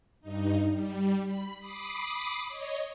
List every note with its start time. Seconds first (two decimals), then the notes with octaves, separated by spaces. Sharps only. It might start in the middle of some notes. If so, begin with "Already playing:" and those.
0.21 G2 D#4
0.71 G3
1.25 B5
1.58 B5 D6 D#6 C7
2.48 C#5 D#5